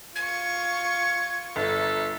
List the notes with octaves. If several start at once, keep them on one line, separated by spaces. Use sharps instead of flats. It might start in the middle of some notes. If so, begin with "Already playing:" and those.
F4 C#6 G#6
G1 A4